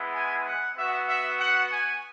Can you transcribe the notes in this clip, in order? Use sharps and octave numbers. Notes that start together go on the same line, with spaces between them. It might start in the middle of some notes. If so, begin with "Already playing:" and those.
Already playing: G#3 B3 E4
G#5
F#5
B3 F#4 E5
E5
F#5
G#5